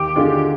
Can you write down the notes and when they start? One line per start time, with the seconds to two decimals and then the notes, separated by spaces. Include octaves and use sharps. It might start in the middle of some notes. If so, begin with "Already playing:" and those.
Already playing: D#2 G4
0.16 D3 G#3 D4 F4